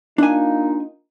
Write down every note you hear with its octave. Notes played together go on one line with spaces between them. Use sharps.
A#3 D4 D#4 F4 G#5